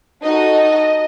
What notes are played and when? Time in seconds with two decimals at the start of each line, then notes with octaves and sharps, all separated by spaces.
0.23 D#4 F#4 A4 D#5